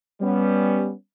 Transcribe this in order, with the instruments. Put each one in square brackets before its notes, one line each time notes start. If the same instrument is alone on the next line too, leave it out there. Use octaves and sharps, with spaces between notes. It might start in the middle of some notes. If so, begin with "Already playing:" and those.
[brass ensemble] G3 B3 C#4